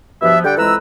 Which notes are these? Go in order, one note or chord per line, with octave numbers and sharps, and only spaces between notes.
G2 B2 F3 B3 E5
D3 G3 A4 F#5 G5
F2 E3 G#3 B4 A#5 E6